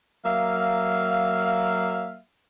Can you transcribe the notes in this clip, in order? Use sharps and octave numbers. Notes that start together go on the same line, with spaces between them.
F#3 A#3 E5 F5